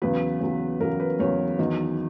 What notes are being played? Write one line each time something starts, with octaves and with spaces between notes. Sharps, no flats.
E2 C#3 F#3 B4
E2 C#3 F#3
E2 C#3 F#3 A#4
B4
E2 C#3 F#3 C#5
E2 D#3 F#3